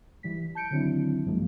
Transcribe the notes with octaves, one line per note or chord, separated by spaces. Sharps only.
E3 G3 B6
A5 G6 C#7 D7
D3 D#3 F#3 C4 D4 E4
B1 G2 F3 F#3 G#3 A#3